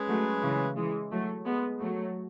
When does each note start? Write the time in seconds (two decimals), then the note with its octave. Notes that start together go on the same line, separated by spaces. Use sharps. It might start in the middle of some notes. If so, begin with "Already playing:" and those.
Already playing: G#3 C#4 G#4 B4
0.08 F#3 A3
0.42 C#3 E3
0.76 E3 G#3
1.11 F#3 A3
1.45 G#3 B3
1.80 F#3 A3